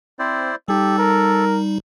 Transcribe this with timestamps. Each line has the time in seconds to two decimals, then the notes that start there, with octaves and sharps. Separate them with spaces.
0.19 C4 E4 C5 D5
0.68 G3 D#4 G4 A4
0.98 A#4